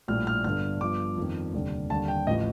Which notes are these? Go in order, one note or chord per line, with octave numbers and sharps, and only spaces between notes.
A#1 A2 G3 F6
F6
G1 G2 D3 F6
G1 G2 F3 D6
F2 D#3 G3
F1 D#2 D3 G3
D#2 D3 G3 A5
G5
A1 A2 F3 D#5